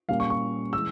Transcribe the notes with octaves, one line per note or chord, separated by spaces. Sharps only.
A#2 G3 A#3 C#4 F5
C#6
C#6
E3 G#3 E6